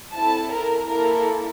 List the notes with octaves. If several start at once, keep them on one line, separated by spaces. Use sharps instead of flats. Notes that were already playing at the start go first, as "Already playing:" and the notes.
C4 E4 A4 A5
A#4
A#3 E4 A4 A#4